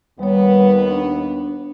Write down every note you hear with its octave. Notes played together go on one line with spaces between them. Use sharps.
D#2 G3 B3 C#5
D4